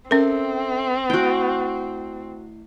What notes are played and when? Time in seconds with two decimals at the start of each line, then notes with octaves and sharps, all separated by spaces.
0.11 C4 C#4 A4 A#4 E5 G5
1.10 A3 E4 F#4 G5 C7